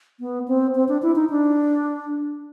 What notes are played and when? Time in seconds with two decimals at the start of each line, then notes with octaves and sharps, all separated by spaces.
0.20 B3
0.48 C4
0.75 C4
0.88 D4
1.02 E4
1.16 D#4
1.30 D4